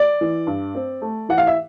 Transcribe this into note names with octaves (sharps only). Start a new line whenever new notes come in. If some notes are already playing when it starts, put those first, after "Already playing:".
Already playing: D5
E3
G2
C4
A3
E3 F#5
F5
E5